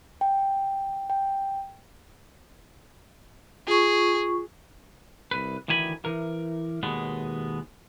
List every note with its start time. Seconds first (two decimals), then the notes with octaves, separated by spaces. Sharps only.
0.21 G5
1.10 G5
3.67 F4 G#4 C#6
5.31 C2 B4
5.68 D2 D#3 E3 G#5 B5
6.05 E3 A#4
6.83 D#2 B2 G#3 B3